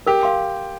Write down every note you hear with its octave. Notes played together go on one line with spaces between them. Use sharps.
G4 A#4
F5 C6